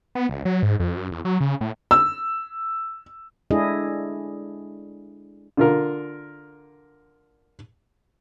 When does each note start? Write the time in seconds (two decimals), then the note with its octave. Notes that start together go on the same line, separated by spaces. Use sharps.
0.15 B3
0.29 C#2
0.45 F#3
0.63 G#2
0.80 F2
0.97 F#2
1.11 E2
1.25 F#3
1.40 C#3
1.61 A2
1.91 E6
3.51 G#3 D4 E4 G#4 A4 D#5
5.57 D3 F4 A#4